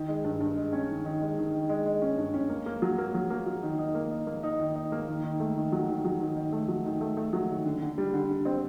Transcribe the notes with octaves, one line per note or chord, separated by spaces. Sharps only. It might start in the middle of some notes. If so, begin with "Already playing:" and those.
Already playing: D#3
G#3
G2
G2
G#3
C#4
D#3
D#3
G#3
D#3
D#3
G#3
G#3
C#4
G2
C#4
A#3
A#3
F#3
A#3
F#3
A#3
F#3
D#3
D#4
A#3
D#4
A#3
D#4
D#3
D#4
A#3
D#3
D#3
A3
D#3
F#3
D#3
F#3
D#3
D#3
A3
F#3
D#3
A3
A3
F#3
D#3
D3
D3
G3
D3
D3
C4